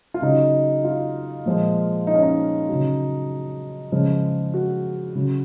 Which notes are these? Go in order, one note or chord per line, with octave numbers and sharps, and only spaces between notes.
F4
C#3 F#3 D#4
F4
A#2 F3 G#3
D#4
C#4
D#4
C#3 F#3
C#3 F3 G#3
F#4
C#3 F#3